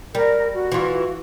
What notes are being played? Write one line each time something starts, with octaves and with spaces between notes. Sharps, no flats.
G3 A#4
F#4
E3 F4